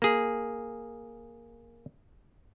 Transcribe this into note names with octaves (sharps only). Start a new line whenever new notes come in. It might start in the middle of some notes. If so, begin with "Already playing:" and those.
A#3 G#4